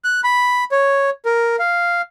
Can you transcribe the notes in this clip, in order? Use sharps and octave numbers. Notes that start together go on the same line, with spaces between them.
F#6
B5
C#5
A#4
F5